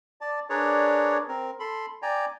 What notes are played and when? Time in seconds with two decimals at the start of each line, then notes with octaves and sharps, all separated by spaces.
0.21 D5 A5
0.49 D4 G#4 A#4 B4 C#5 D5
1.28 C4 A#4
1.60 A4 B5 C6
2.02 D5 G5 G#5 A#5